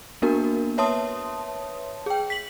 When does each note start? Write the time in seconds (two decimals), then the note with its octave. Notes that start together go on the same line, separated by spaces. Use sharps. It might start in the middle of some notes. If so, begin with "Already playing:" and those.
0.22 A#3 B3 D4 F#4 A#4
0.78 B4 C#5 E5 A5 C6 D#6
2.06 G#4 G5
2.30 B6 F#7